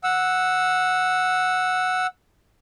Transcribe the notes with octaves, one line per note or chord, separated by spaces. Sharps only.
F#5 E6